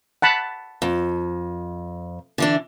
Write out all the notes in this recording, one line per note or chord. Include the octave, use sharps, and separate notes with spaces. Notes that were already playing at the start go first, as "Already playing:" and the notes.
F#5 A5 B5
F2
D3 E3 D4